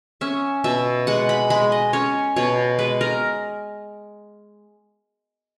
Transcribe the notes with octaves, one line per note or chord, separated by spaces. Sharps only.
C#4 E5
B2 E5
G#3 F#5
B5
G#3 B5
D#5
C#4 C#5
B2 C#5
G#3 B4
A#4